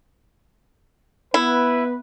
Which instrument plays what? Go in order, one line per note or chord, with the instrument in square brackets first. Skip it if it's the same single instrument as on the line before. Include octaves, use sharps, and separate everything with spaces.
[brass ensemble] B3 B4 [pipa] E4